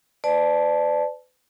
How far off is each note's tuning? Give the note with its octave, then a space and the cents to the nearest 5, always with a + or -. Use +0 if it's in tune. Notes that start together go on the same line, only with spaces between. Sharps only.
B4 +45 D5 +10 A5 -10